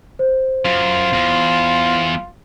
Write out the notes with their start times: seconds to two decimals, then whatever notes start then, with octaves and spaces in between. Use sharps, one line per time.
0.19 C5
0.65 F#2 F4
1.13 E2